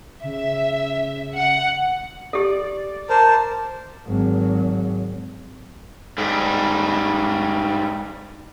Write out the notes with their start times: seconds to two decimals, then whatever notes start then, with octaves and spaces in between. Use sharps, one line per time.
0.24 C#3 E5
1.36 F#5
2.33 G4 A4 D5
3.09 A#4 C5 A5
4.06 G#1 F#3
6.18 G#2 G3